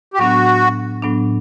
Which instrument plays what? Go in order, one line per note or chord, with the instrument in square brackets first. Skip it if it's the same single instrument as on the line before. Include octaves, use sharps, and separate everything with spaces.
[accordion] G4
[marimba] A2 F#3 B3 D4 [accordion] F#4
[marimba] A2 F#3 B3 D4